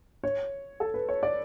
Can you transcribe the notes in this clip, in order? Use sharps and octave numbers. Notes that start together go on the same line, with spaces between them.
C#5
A4
B4
C#5
D5